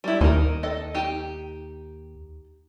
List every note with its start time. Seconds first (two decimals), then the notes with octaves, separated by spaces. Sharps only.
0.04 G3 E4
0.21 D#2 D#4 A#4
0.63 A4 D#5
0.95 D#4 G4